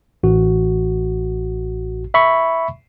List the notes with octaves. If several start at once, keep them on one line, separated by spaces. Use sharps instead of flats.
A1 F#4
E5 B5 C#6